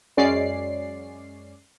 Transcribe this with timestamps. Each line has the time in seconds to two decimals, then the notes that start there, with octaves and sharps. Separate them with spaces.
0.17 F#2 G#3 C#4 D5 C7